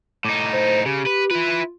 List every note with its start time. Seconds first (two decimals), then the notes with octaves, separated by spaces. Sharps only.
0.25 A2 D#4 D6
0.53 C5
0.86 C#3 G4
1.06 B4
1.31 E4 F4 B4